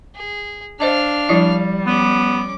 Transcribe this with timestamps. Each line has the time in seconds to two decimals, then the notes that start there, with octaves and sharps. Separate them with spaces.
0.15 G#4
0.80 D4 C5 D#5 F5 A5 F6
1.29 F3 G3 E4 D#5
1.86 B3 C#4 D6